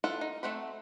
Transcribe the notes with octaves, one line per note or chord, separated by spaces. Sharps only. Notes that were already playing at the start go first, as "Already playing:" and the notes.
E4 F4 A4 B4 F#5
D#4
A3 C4 F#5 B5